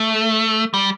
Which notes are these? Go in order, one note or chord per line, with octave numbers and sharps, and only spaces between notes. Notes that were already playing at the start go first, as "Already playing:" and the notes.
Already playing: A3
G3